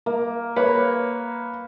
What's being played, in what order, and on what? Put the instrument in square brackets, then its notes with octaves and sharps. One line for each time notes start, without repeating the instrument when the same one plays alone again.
[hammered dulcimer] A#3
[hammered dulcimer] A#3 [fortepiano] B4 C#5